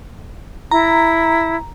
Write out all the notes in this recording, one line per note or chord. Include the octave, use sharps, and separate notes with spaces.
E4 A#5